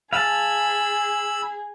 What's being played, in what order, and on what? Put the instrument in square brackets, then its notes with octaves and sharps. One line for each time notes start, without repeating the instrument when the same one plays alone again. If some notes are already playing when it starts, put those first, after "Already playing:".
[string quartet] G#4 [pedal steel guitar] F5 A5 [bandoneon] B5 E6